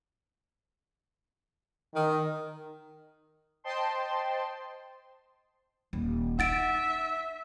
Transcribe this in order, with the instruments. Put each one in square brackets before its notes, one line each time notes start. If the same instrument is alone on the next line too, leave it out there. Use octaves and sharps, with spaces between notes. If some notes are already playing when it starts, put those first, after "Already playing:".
[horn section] D#3
[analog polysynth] C5 D#5 G5 A5 C6
[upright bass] D#1
[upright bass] D#4 [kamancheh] E5 [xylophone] F#5 A6 D7